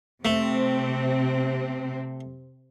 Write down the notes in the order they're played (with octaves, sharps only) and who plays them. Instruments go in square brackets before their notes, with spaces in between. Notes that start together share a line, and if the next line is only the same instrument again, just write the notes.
[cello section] C3 C4 [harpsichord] A3